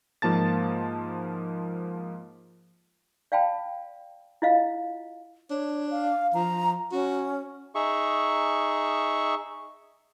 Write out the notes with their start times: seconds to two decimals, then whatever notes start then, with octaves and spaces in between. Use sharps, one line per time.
0.22 G#2 F3 A#3 A5 A6
3.32 D5 F5 G5 A5 B5
4.42 E4 F4 D#5 F5
5.50 D4 C#5
5.91 F5
6.34 F3 A#5
6.92 C#4 F#4
7.75 D#4 G#4 E5 C#6